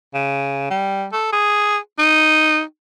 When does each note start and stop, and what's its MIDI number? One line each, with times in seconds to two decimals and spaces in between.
0.14 0.70 49
0.70 1.06 55
1.12 1.29 69
1.32 1.77 68
1.98 2.62 63